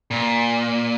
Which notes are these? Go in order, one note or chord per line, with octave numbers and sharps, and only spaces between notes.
A#2